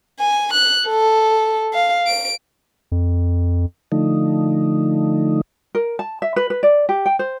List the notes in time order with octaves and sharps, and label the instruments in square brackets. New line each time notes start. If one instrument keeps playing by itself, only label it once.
[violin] G#5
F#6
A4
F5
D7
[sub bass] F2
[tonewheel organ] D3 F3 A3 D#4
[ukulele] A#4
A5
E5
B4
B4
D5
G4
G5
C5